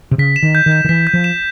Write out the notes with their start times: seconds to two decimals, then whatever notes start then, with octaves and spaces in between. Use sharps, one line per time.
0.11 C3
0.18 C#3 B6
0.36 E7
0.43 D#3
0.55 G6
0.66 D#3
0.72 G6
0.85 D#3
0.89 E3 B6
1.07 G6
1.13 F3
1.24 E7